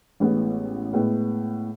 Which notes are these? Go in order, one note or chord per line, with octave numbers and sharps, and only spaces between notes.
A1 A2 G#3 B3
A2 G#3 B3